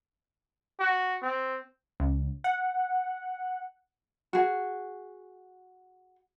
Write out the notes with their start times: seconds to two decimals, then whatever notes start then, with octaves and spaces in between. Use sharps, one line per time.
0.79 F#4
1.22 C4
2.00 C#2
2.44 F#5
4.33 F#4 G#4